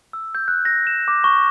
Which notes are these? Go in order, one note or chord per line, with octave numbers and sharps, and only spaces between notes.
E6
G6
F#6
A#6
E7
D6
C#6